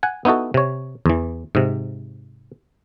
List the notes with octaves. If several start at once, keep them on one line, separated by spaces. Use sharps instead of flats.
F#5 G#5
B3 D#4 E4 F#4 A4
C3 C#5
E2 E3
G#2 C3